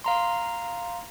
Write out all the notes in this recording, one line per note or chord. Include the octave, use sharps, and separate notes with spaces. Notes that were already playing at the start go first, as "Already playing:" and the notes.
F5 A#5 C6